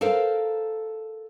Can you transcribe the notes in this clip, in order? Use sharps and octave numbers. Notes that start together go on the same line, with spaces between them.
A4 A#4 C5 F5